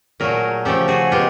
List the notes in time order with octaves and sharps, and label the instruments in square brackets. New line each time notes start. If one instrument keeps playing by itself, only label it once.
[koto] A#2 F#3 A3 G#4 A#4
C#3 F3 A3 G4 A4
F#4 G#4
B2 G#3 F4 G4